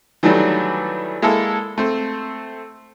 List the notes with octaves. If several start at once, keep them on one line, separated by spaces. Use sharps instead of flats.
D#3 E3 F#3 G3 A3 D4
G#3 A#3 E4 A4
A3 C4